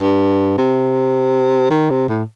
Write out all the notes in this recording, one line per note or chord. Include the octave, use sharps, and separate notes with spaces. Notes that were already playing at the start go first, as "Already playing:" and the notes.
G2
C3
D#3
C3
A2